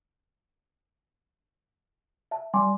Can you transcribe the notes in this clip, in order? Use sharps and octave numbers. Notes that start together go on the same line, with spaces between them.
E5 A5
G3 G#5 C6 D6